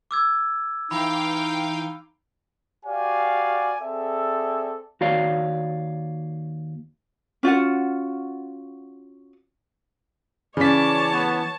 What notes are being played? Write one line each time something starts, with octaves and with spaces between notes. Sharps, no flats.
D6 E6 G#6
E3 D#4 F5 G5 B5
F#4 G4 D5 F5 G#5
C4 G#4 A4 D5 E5
D#2 F#4 C#5 D5 F5
C#4 F4 F#4 F#5
C#3 E3 C#4 C#5 D5 A5 B6
B3